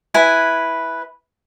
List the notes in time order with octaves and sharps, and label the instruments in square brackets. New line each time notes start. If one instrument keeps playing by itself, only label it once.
[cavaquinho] E4 B4 G#5